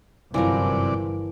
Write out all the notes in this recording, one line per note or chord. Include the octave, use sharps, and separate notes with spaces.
G1 F#2 C3 E3 F3 A#4 D5